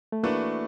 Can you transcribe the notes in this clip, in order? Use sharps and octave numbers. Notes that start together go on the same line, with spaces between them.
A3
E3 A3 A#3 D4 F#4 B4